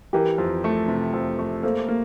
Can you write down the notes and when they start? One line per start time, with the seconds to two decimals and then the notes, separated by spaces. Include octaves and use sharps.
0.13 E3 G4 A#4
0.38 F2
0.64 A3
0.88 C3
1.13 F2
1.39 A3
1.63 A#3 A4 C5
1.88 A#3